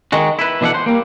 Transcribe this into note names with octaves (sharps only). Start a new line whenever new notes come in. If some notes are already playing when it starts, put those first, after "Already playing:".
D#3 G#3 F#4
E4 B4
B2 E3 D4 G#4 A4 F#5
C5
G3 A#3